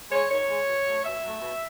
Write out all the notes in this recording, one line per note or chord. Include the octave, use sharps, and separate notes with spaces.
G#3 C#5
D#3 C#5
G#3
B2
F#3 A3
B2 E5
F#3 A3
B2